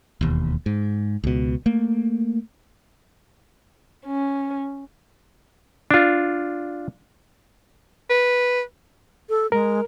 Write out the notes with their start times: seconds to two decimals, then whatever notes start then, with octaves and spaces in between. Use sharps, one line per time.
0.21 E1 D#2
0.66 G#2
1.24 C#2 B2
1.66 A3 A#3
4.06 C#4
5.91 D4 F4
8.10 B4
9.29 A4
9.52 G#3 A#4